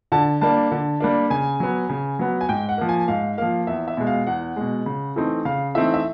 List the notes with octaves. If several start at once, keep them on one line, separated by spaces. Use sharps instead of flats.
D3 A5
G3 A#3 D4 A5
D3
G3 A#3 D4
C#3 G#5
F#3 B3
C#3
F#3 B3
G#5
G#2 G5
F#5
F3 A#3
G#5
G#2 F5
F3 A#3 F5
E2 E5
E5
B2 G#3
F5
E2 F#5
B2 G#3
C#3
E3 A3 C4 D#4
C#3 F5
E3 A3 C4 D#4 E5
E5